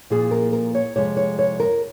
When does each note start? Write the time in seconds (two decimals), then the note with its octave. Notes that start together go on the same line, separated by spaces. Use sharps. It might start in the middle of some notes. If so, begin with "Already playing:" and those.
0.10 A#2 F3 A#3 G#4
0.31 A#4
0.53 A#4
0.75 C#5
0.96 F2 C3 F3 G#3 C#5
1.17 C#5
1.39 C#5
1.60 A#4